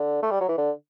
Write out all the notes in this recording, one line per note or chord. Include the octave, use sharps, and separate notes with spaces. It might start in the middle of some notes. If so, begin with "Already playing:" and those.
Already playing: D3
A3
G3
F#3
E3
D3